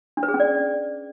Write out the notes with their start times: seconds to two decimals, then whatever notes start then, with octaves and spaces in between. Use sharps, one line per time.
0.17 D4
0.23 B4
0.28 G#4
0.34 C#4
0.40 D5